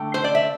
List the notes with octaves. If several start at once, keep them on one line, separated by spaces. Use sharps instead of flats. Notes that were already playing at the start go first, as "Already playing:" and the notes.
Already playing: D3 A3 G5
C5
D5
E5